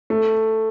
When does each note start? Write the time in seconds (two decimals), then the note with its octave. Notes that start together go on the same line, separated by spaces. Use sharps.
0.10 A3